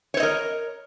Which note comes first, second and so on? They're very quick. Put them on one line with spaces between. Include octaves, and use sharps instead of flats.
C#5 C5 D#5 A#4